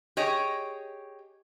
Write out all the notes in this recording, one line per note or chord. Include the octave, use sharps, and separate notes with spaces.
G4 G#4 C#5 D#5